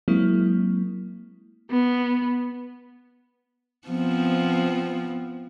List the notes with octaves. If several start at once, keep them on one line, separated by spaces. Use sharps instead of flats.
F#3 G#3 A#3 C4 E4
B3
F3 B3 C4